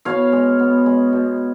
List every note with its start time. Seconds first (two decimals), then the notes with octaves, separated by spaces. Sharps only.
0.05 B2 C#5 F5
0.32 G#3
0.59 B3
0.86 G#3
1.13 B2